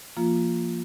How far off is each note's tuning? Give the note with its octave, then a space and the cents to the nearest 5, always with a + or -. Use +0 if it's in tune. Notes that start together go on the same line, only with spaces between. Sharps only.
F3 -25 A#3 +0 F4 +0